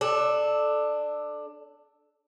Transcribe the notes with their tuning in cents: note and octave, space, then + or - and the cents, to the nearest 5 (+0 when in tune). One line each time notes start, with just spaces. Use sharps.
D4 +15 A4 -10